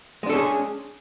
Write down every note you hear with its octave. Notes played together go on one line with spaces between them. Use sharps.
G#3 C#4 D4 G#4 A4